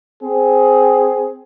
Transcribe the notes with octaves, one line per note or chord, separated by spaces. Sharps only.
C4 G#4